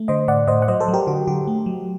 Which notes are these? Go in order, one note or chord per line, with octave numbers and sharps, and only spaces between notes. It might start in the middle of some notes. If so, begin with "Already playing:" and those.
Already playing: A3
D3 C5 D#5
A2 D5 F#5
A2 C5 D#5
F#5
F#3 C5 D#5
A4 C5
F#3
G4 A#4
D3 F#4
D3 G4
A3
F#3